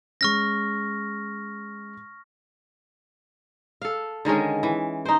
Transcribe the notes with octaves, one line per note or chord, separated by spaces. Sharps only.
G#3 C#4 C#6 F6 A#6
A4 F5
D3 D#3 G#3 C#4
E3
D#4 C5